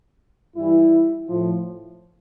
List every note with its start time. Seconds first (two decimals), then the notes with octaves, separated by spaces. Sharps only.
0.55 G2 E3 G3 E4
1.27 A2 F3